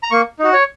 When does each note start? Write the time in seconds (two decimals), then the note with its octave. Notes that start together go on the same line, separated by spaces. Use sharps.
0.03 A#5
0.11 A#3 C#6
0.39 D#4 F#4
0.53 C#5